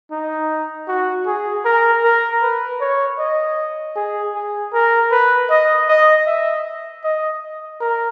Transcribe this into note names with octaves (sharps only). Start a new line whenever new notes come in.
D#4
F#4
G#4
A#4
A#4
B4
C#5
D#5
G#4
G#4
A#4
B4
D#5
D#5
E5
D#5
A#4